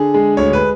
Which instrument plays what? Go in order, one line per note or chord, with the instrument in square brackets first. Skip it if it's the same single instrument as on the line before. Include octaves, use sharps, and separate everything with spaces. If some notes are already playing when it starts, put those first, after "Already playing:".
Already playing: [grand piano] D3 G#4
G#3
D2 C#5
B4